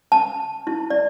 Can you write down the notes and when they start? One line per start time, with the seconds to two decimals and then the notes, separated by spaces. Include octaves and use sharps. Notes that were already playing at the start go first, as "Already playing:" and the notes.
0.12 A5
0.67 E4
0.90 D5